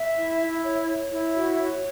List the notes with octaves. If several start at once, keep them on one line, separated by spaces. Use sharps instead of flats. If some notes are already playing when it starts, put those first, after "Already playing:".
Already playing: E5
E4
E4
C#5
C#5
E4
F#4
C#5